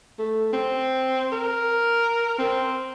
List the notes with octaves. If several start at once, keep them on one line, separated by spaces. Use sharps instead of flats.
A3
C4
A#4
C4